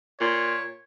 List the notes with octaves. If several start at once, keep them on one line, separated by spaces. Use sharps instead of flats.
A#2 C#5